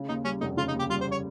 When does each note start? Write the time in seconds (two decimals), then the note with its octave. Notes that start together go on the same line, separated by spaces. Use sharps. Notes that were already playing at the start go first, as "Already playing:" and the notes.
Already playing: C#3
0.08 D#2 D#4
0.24 G3 C#4
0.40 F1 D#4
0.57 C#3 F4
0.68 D#4
0.73 D#2
0.79 G4
0.89 G3 F4
1.01 C5
1.11 C#5